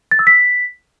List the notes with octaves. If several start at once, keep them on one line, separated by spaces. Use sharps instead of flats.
A6
E6
B6